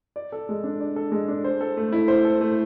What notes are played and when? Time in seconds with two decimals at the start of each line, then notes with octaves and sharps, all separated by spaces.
0.16 D5
0.32 A4
0.49 G#3
0.64 D4
0.80 D5
0.96 A4
1.12 G#3
1.28 D4
1.44 C5
1.61 A4
1.77 A3
1.92 E4
2.08 C5
2.25 A4
2.41 A3